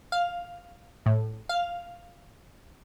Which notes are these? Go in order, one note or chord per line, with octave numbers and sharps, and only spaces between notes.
F5
A2
F5